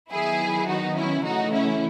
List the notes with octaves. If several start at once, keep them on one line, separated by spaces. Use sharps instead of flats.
D#3 F#3 B3 E4 G#4
D#4 F#4
C#4 E4
C#3 E3 A3 D#4 F#4
C#4 E4